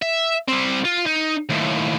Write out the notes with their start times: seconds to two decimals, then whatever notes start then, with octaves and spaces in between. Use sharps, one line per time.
0.02 E5
0.48 G3 C4
0.85 F4
1.06 D#4
1.49 D#2 A2